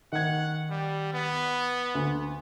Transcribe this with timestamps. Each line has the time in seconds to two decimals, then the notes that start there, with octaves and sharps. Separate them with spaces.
0.12 D#3 F#5 G#6
0.70 G3
1.13 B3
1.95 D2